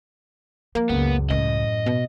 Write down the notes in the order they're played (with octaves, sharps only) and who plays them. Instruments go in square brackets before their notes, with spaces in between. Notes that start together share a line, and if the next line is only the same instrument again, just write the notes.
[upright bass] F3 [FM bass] A#3
[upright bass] C#2 F#2 [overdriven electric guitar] B3
[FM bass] C#2 [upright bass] F#2 A2 [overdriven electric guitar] D#5
[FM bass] B2